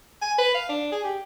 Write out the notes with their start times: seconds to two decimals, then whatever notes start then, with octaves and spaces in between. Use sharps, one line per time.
0.21 G#5
0.38 B4
0.54 F5
0.69 D4
0.92 G#4
1.04 G4